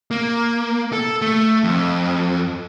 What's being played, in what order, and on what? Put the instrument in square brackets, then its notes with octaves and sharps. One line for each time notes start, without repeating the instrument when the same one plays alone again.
[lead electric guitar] A#3
A4
A3
F2